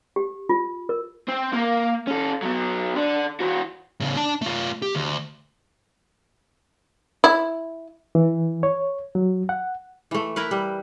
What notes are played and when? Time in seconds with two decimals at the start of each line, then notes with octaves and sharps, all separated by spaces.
0.16 G4
0.49 F4
0.89 A#4
1.29 C4
1.54 A#3 A#4
2.07 C#4 A4
2.43 F#3 B3
2.96 D3 D4
3.40 E3 F#4
4.00 A2 C#3
4.16 D4 A5
4.42 A3 F4
4.82 G4
4.95 D2
7.24 E4
8.15 E3
8.63 C#5
9.15 F#3
9.49 F#5
10.11 E3 A3
10.36 E4 A#4 B4
10.51 G3